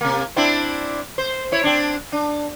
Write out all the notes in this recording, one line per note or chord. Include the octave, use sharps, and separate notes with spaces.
C3 A#3
C4 D4 E4
C5
E4 C#5
C4 D4
D4